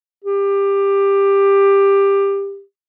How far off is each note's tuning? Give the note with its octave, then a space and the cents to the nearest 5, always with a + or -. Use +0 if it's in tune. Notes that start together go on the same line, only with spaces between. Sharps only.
G4 +15